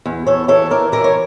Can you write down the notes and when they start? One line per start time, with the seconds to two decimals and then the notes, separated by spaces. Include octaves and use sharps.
0.06 E2
0.26 E2 A4 C#5
0.48 E3 A4 C#5
0.70 E3 A#4 D5
0.92 E3 A#4 D5
1.04 C#5